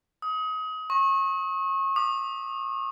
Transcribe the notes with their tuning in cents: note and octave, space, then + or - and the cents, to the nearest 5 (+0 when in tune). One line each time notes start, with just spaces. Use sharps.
D#6 +30
C#6 -30
D6 +45